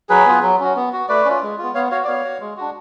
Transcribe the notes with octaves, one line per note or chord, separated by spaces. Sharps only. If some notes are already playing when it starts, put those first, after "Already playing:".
F#3 G#4 B4
B3 F4
F#3
C#4 F#4
B3
F#4
A3 B4 D5
C#4 F4
G#3
B3 F4
B3 C#5 F5
F#4 C#5 F5
D5
B3 C#5 F5
F#4
G#3
D4 F#4